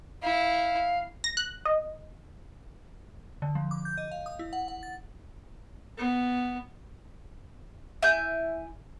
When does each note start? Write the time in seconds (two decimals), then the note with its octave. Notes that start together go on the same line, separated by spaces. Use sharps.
0.23 E4 F5
1.24 A#6
1.37 F#6
1.65 D#5
3.42 D3
3.55 F3
3.71 D6
3.85 G6
3.97 D#5
4.11 F5
4.26 D#6
4.39 E4
4.53 F#5
4.68 F#5
4.83 A6
5.98 B3
8.03 E4 G#5 G6